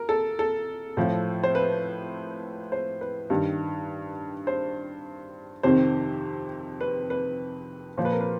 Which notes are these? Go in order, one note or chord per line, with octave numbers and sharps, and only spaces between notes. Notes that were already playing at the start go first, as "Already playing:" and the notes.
Already playing: A#4
A4
A4
A2 F3
C5
B4
C5
B4
G2 D#3
C5
F2 C3 D#3 C5
B4
B4
A#2 F3 C5
B4
A#4
B4